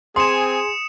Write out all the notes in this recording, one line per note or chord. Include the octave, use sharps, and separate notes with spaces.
C4 G#4 G#5 C6 D#6 C#7 E7